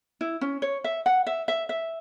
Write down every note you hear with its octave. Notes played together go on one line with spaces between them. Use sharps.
E4
C#4
C#5
E5
F#5
E5
E5
E5